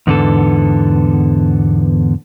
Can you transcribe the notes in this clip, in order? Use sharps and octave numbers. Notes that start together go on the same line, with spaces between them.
E2 G#2 D3 B3 A4